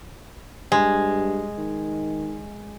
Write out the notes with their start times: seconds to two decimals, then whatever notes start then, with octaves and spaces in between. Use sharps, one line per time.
0.72 G2 G#3
1.58 D#3